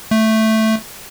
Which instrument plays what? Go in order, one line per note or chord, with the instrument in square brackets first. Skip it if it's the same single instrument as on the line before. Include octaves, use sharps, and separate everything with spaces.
[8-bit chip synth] A3